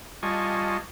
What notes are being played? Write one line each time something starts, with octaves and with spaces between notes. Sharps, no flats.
G3 F4 D#5 G#5 A5 C#6